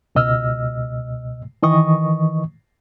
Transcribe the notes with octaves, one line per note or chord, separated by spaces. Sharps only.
C#2 B2 D#5 E6 F6
D#3 E3 D#5 C#6 D#6